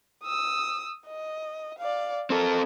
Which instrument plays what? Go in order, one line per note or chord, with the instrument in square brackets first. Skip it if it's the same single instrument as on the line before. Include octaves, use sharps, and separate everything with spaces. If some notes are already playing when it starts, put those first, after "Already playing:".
[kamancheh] D#6 E6
D#5
D5 F5
[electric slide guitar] C4 A4 [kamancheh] A#4